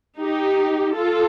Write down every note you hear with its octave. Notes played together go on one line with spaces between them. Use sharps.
D#4 G4
F4 A4